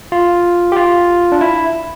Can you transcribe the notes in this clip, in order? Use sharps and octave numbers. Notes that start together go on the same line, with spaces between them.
F4
G4
F4
D4
E4